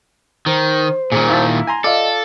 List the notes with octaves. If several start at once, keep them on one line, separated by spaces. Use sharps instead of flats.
D#3 C5
A#2 D#3 G#4
A#3 E4 A5
G#5 A#5 C6
F4 A4 D5 D#5